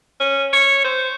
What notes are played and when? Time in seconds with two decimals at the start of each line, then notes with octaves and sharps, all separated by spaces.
0.20 C#4
0.53 C#5
0.84 C5